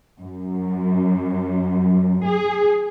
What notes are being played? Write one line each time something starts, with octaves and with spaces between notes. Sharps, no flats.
F#2
G#4